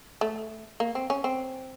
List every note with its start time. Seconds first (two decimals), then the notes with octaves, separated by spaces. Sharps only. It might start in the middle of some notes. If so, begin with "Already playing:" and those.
0.21 A3
0.80 A#3
0.95 C4
1.10 C#4
1.24 C4